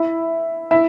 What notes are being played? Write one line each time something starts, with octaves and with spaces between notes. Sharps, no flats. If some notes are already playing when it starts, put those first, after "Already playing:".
Already playing: E4
E4